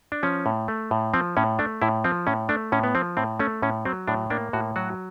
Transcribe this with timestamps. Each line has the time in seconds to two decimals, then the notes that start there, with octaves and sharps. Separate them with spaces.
0.12 D4
0.23 F3 C#4
0.46 A2
0.68 A3
0.91 A2
1.14 F3 C4
1.37 A2 C#4
1.59 A3 D4
1.82 A2 E4
2.04 F3 C4
2.27 A2 C#4
2.49 A3 D4
2.72 A2 C#4
2.83 B3
2.95 F3 C4
3.17 A2 C4
3.39 A3 C#4
3.62 A2 C#4
3.85 F#3 C4
4.08 A2 D4
4.30 A#3 D4
4.53 A2 F#4
4.76 F#3 F#4